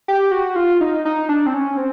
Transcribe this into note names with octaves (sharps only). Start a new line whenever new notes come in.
G4
F#4
F4
D#4
D#4
D4
C4
C#4
C4